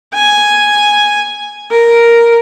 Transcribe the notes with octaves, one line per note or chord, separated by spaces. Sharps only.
G#5
A#4